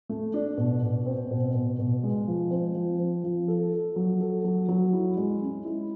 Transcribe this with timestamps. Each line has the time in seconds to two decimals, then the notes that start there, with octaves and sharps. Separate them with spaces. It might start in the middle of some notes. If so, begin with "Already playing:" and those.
0.09 A3
0.34 D4
0.57 B2
0.82 B2
1.06 C4
1.31 B2
1.55 B2
1.79 B2
2.03 G#3
2.27 F3
2.51 C4
2.75 F3
2.99 C4
3.24 F3
3.48 A4
3.72 A4
3.96 F#3
4.21 A4
4.44 F#3
4.69 F#3
4.93 E4
5.17 G#3
5.41 C#4
5.65 E4